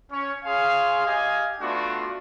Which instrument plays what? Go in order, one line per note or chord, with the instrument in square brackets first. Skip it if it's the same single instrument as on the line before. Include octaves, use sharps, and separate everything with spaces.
[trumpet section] C#4 C#5
G#4 C#5 F5 G#5 C6
G4 D#5 F5 G#5
A3 B3 D4 F4 F#4